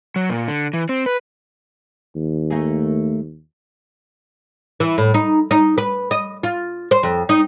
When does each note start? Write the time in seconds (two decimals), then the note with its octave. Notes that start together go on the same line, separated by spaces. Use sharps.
0.16 F#3
0.29 A#2
0.48 D3
0.73 E3
0.89 C4
1.06 B4
2.16 D#2
2.50 A3 A#3 G#4
4.80 E3
4.98 A2
5.14 D#4
5.51 D#4
5.78 B4
6.11 D#5
6.43 F4
6.91 C5
7.03 F2
7.29 D#4